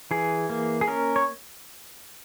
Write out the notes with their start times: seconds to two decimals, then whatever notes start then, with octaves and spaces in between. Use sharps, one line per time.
0.11 E3 G#4
0.50 A#3
0.81 G#4
0.88 C#4 A#4
1.16 C#5